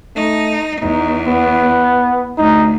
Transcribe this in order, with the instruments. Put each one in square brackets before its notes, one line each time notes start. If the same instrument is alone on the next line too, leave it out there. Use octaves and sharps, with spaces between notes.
[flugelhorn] A3 [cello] D#4
[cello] E2 [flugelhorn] D#4
[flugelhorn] B3
[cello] D2 [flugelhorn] D#4